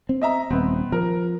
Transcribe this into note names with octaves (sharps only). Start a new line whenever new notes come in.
C4
D#5 E5 A#5
D#1 B3 C4
F3 A#4